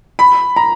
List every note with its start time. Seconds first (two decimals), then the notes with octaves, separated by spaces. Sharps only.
0.19 B5
0.56 A#5